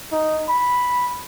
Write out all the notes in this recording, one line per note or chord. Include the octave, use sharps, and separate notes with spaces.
D#4
B5